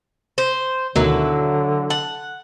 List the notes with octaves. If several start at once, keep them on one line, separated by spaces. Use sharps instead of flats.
C5
D2 B2 D3 D#3 F#3 E4
F#5 A5